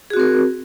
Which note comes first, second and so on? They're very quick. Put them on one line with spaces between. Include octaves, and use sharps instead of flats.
G#4 F#4 C4 A#4